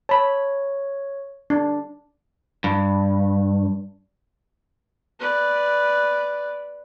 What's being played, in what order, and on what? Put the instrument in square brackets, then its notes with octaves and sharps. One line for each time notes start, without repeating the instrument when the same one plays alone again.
[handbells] C#5 [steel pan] A5 B5
[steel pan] D4
[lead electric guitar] G2
[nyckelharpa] B4 D5